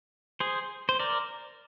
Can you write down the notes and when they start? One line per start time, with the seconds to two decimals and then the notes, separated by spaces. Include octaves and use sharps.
0.40 G#4 C5
0.89 C5
1.00 A#4 D5